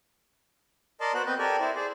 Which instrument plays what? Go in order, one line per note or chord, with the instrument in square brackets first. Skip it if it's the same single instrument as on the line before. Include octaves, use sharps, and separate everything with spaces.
[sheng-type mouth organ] A#4 D5 D#5 A5 C6
B3 F#4 C5 F#6
C4 B4 D#5
G4 A4 A#4 D5 G#5
E4 C5 D5
G#4 C5 D5